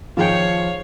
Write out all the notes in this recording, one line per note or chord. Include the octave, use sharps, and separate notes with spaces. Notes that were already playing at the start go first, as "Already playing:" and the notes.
D#3 F3 F4 G#4 C#5 F5 G5